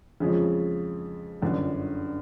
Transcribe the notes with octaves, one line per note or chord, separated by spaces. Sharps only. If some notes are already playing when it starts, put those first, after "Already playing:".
F2 C#3 F3 G#3 C#4
G1 F#2 D3